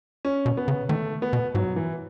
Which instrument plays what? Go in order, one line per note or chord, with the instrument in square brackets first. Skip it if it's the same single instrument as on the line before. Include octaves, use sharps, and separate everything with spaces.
[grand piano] C#4
[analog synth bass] B2
[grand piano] B3
[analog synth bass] C#3
[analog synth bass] D#3 [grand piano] A3
[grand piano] B3
[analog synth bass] B2
[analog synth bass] G#2 [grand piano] F#3
[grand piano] E3